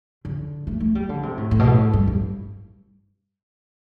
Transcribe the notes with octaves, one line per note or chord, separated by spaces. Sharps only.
D3
A3
A3
G3
D3
C3
A2
A2
B2
A2
G2
G2